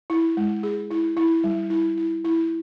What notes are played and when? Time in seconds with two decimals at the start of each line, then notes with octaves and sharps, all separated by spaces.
0.10 E4
0.37 G#3
0.63 G#4
0.91 E4
1.17 E4
1.44 G3
1.70 E4
1.97 E4
2.24 E4